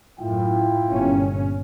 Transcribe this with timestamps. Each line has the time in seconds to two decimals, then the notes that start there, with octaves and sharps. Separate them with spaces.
0.20 F#2 A2 E4 F4 G5
0.91 G1 A#2 C#4